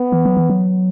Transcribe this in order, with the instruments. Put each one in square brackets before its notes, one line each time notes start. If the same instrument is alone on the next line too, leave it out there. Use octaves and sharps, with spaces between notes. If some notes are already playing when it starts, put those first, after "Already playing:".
Already playing: [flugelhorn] B3
[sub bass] E3
F#3
E3
F#3